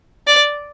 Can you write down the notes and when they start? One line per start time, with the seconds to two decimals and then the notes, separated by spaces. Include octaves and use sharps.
0.27 D5